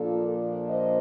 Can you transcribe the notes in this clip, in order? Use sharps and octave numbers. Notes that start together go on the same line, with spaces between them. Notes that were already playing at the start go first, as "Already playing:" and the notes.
Already playing: A#2 F3 A#3 D4 F4 A4
C5 D#5